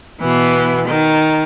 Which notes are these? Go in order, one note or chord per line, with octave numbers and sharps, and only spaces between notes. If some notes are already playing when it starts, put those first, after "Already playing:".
B2 E3 B3
D#3